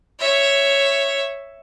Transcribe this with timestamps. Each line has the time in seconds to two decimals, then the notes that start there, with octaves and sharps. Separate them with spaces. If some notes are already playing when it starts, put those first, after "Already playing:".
0.19 C#5 E5